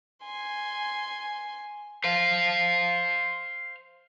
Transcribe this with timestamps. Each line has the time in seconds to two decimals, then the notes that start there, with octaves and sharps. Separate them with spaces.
0.24 G#5 C6
2.04 C5 F5